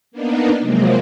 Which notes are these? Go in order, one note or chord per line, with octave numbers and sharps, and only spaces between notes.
A#3 B3 D4 D#4
C3 F3 F#3 G#3 A#3 C4